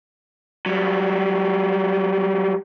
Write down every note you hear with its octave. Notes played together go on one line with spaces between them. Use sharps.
F#3 G3